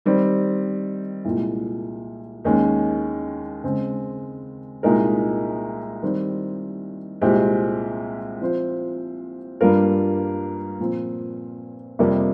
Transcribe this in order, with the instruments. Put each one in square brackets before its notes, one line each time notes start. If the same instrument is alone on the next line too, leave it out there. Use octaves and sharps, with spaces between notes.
[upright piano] D#3 G3 C4
C2 A#2 G#3
D#2 D#3 G#3 C#4
C#3 G#3 C4
C2 A#2 G#3 D#4 A#4
D#3 G3 C4
C2 A#2 G#3 C4 G4
F3 C4 F4 C5
G2 G3 A#3 F4 A#4
A#2 F3 C4
F2 C3 G3 A#3